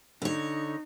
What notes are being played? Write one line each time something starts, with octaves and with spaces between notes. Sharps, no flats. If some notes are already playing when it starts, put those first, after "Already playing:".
D3 D#4 C#5